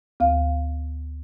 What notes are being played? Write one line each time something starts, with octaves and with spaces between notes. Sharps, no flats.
D2 F5